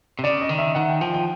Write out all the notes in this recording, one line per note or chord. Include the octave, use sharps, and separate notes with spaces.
C3
C#3 D5
D#5
D#3
E5
D#3 F#5
G5
F3 G5
G5